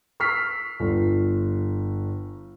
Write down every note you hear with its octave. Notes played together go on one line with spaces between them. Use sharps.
C#6 E6 F6 B6 C7
G1